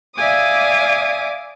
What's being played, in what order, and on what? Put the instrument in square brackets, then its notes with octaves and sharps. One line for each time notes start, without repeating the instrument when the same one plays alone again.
[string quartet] D5 E5 F5 G#5 D6 D#6